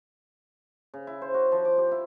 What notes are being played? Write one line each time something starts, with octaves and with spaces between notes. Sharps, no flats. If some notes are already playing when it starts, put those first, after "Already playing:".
C#3
E4
C5
F#4
F3
D6
G4
E4